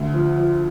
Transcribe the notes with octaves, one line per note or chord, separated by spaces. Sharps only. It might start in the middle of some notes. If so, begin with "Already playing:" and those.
Already playing: D2
F3
F3